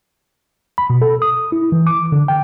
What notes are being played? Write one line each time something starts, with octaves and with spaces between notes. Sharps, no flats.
B5
B2
A4
D#6
E4
E3
D6
D3
G5